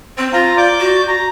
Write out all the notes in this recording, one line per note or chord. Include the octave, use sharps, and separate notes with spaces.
C4 C5
F4 F5 A#5
D5 D6 G6
F#4
A#5